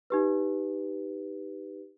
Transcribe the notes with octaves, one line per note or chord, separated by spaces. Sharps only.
D#4 G4 B4